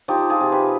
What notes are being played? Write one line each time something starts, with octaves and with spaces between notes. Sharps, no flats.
F3 D#4 G4
F4 G#4
C3
G4 B4